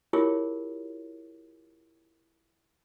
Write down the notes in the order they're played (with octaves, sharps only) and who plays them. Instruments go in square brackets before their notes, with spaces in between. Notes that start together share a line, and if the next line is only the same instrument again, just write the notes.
[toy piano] E4 F4 G4 G#4 A#4 C#5